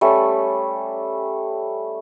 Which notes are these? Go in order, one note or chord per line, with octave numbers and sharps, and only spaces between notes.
G3 A3 C#4